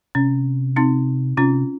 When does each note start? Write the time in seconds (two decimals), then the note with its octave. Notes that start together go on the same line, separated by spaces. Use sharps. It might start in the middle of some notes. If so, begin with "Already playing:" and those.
0.15 C3 C#4
0.76 C4 D#4
1.37 C3 C#4 F4